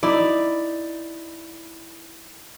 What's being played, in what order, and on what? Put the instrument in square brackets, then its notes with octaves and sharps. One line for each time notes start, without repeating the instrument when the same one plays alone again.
[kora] D#4 E4 [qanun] D5